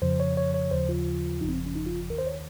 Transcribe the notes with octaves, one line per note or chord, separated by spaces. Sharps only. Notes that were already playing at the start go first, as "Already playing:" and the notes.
F2 C#3 F3 C5
C#5
C#5
C#5
D#2 C#3 F3 C5
F4
G1 F2 C#3 F3 D#4
C4
C#4
D#4
F4
D#2 D#3 A#4
C5
C#5